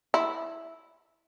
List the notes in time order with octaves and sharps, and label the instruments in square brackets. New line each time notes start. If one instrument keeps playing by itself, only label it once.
[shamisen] E4